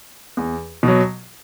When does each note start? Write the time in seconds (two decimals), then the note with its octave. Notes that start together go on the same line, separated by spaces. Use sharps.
0.37 E2
0.83 B2 F#3